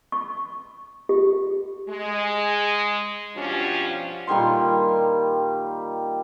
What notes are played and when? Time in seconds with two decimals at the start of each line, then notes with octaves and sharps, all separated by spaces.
0.12 C#6
1.09 G4
1.88 G#3
3.36 G2 B2 F3 C#4 D4 G4
4.27 A#2 D#3 G3 C6